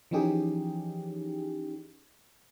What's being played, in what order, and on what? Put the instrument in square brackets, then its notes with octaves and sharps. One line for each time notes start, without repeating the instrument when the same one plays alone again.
[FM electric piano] E3 F3 C#4 D#4 G4 G#4